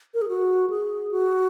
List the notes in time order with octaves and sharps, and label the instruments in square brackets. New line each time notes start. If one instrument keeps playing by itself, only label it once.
[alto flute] A#4
G#4
F#4
G#4
F#4